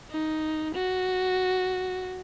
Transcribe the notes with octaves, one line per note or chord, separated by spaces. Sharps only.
D#4
F#4